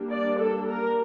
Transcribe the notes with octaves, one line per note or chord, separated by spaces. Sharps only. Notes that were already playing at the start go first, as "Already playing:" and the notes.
Already playing: G3 A#3 D4
D5
A4
A#4